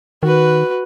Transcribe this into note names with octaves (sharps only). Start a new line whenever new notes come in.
D#3 F#4 B4